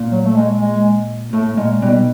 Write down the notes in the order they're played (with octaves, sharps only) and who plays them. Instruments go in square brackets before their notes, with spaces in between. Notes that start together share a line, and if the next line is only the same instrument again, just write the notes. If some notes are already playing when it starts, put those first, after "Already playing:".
Already playing: [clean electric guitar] A#2
[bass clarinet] F#3
A3
G#3
G#3
[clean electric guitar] A2 [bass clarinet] A3
[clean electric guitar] A#2 [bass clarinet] G#3
[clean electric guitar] B1 B2 [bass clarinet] G3